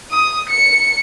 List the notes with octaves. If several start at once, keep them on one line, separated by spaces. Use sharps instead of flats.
D#6
C#7